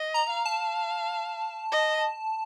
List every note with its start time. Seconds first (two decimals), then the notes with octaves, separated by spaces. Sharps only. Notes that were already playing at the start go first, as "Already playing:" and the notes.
Already playing: D#5
0.14 A#5
0.30 F5
0.46 A5
1.72 D#5